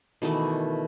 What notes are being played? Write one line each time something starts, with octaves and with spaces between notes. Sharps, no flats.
B2 D#3 E3 A3